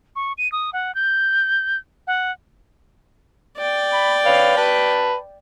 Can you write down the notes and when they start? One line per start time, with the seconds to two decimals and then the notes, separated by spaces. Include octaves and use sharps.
0.16 C#6
0.38 D#7
0.52 D#6
0.73 F#5
0.95 G6
2.07 F#5
3.58 D5 G5
3.93 B5
4.26 B4 C#5 F5
4.57 B4 A5 B5